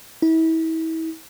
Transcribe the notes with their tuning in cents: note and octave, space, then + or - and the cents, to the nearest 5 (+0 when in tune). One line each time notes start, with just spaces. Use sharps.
E4 -35